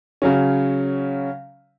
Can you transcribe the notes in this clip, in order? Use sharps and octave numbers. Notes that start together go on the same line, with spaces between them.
C#3 F#3 C#4